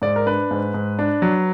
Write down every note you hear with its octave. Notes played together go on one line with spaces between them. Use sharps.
G#2 D5
A#4
D4 B4
G#2
G#2
D4
F#3